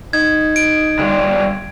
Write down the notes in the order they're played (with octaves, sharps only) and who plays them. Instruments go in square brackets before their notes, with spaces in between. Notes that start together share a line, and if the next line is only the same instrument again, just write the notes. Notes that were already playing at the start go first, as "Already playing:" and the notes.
[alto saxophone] D#4 [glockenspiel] G#6
[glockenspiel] D7
[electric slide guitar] D3 G3 F4